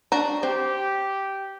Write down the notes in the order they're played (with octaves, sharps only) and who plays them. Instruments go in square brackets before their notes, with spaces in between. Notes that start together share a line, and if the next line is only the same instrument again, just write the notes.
[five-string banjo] D4 F#4 A#5
[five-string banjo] C4 [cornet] G4